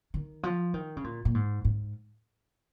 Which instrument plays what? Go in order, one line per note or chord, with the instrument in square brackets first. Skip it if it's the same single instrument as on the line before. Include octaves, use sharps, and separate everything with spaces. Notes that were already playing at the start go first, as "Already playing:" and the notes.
[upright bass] D#3
F3
D#3
C#3
A#2
A#2
G#2
G#2